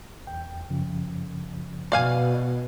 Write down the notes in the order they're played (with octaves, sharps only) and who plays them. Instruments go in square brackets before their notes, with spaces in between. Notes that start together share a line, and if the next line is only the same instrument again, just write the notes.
[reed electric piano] E2 G5
F#2 C#3 F3
[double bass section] B2 [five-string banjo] D5 F5 G#5